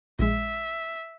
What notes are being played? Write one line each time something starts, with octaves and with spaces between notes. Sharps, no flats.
A#1 G#3 E5